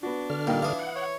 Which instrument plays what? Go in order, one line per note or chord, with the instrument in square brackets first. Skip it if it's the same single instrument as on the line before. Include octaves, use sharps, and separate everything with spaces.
[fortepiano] B3 F#4 [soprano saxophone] D4
[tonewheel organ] D3 F6
[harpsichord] A#2 [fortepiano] G3 D#4 G5
[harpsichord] E3 E4 [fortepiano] F5 D6 D#6
[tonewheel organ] F#5
[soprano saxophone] C#5